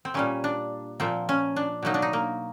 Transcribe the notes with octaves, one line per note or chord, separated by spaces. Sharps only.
C4
A#2 G3 A#3 C#4
D4
A#2 F3 A#3 C4
C#4
D4
B2 F#3 A#3 D#4
D4
D#4
A#3